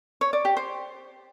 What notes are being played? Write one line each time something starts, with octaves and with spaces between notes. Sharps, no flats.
C#5
D5
G4
C5